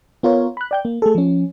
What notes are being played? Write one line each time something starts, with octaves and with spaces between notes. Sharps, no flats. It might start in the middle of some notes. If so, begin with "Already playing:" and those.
B3 F4 A#4 C#5
B5 F#6
D5 G5 G6
A#3
A3 G#4 A4
F3 C#4